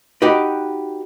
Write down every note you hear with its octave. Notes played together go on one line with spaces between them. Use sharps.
D#4 F#4 G4 B4